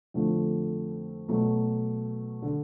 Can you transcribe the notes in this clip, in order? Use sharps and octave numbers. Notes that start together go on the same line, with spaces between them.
F2 D3 F3 A3
B2 F#3 A3
D3